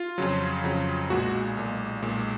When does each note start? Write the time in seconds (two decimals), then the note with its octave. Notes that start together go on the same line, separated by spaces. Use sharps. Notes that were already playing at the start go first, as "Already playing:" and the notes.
Already playing: F4
0.18 F2 C#3 F#3
0.64 F2 C#3 F#3
1.10 B1 A#2 G#3 F#4
1.57 B1 A#2 G#3
2.02 B1 A#2 G#3